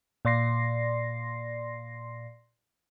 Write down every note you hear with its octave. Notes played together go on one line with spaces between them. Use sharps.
A#2 D5 C6 A#6 C7